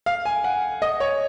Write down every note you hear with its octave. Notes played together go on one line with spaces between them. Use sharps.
F5
G#5
F#5
D#5
C#5